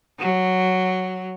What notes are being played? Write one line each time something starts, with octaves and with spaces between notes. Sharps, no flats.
F#3